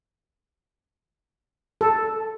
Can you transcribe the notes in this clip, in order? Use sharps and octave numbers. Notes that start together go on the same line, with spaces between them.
A4